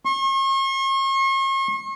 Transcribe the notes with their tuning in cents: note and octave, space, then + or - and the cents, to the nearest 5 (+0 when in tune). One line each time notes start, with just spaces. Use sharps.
C#6 -45